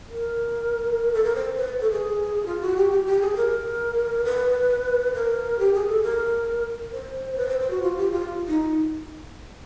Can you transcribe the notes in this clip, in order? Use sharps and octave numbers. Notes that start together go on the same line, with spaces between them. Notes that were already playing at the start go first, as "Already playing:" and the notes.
A#4
A4
A#4
C5
B4
A4
G#4
F4
F#4
G4
G4
G4
G#4
A#4
B4
A#4
G4
G#4
A4
A#4
C5
B4
C5
C5
F#4
F4
G4
F4
D#4